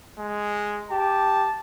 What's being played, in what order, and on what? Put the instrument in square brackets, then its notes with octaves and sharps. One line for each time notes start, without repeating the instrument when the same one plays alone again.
[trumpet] G#3
[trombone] G4 [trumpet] A5